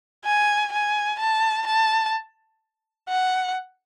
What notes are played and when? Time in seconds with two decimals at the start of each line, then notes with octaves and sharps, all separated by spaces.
0.25 G#5
0.72 G#5
1.19 A5
1.67 A5
3.09 F#5